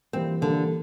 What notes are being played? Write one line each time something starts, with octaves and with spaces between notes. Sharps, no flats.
E3 G3 A#3 C4
D3 E3 G3 A#3